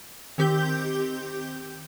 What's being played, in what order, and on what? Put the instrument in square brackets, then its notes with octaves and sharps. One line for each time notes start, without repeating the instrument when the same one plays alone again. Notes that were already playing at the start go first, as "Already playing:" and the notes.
[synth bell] D#3 C4 G4 G6 G7